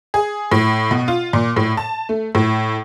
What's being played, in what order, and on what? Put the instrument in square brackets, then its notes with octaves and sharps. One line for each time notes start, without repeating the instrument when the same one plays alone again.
[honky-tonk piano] G#4
A2
B2
F4
A#2
A2
A5
A3
A2